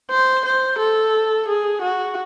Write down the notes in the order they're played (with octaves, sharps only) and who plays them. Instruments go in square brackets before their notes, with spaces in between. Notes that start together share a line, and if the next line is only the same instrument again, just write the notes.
[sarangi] C5
C5
A4
G#4
F#4